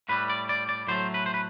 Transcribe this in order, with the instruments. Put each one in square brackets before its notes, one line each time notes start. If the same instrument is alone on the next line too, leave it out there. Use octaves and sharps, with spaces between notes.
[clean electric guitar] A2 G3 B4
D5
D5
D5
A2 F#3 A3 C5
B4
C5
B4